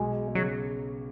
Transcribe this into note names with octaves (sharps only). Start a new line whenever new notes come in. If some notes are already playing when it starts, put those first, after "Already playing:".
Already playing: B1 B2 G#3
C#3 F#3